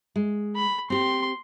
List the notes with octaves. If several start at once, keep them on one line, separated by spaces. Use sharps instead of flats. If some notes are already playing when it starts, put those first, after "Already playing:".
G#3
B5
C4 G4 C6